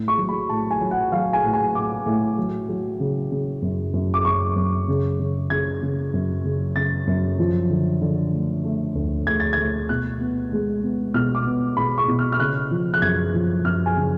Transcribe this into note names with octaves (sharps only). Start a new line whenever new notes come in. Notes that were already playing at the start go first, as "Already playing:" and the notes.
Already playing: A2
C#6
F#3
B5
A2 A5
G#5
F#3
F#5
F#3 F5
G#5
A2
G#5
A2 D6
A2
F#3
F#3
C#3
C#3
F#2
F#2
D6
F#2 C#6
F#2
C#3
C#3
C#3 G#6
C#3
F#2
C#3
C#3 A6
F#2
F3
D3
D3
A3
A3
D2
D2 G#6
A6
A3 G#6
B2 F#6
B3
G#3
B3
B2 F6
D6
B3
B2 B5
C#6
B2
F6
F6
C#3 F#6
F3
F#6
F#2 G#6
F3
F#2 F6
G#5
C#3